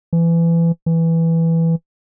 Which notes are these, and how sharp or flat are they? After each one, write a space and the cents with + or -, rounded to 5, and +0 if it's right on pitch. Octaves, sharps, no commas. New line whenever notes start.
E3 +25
E3 +0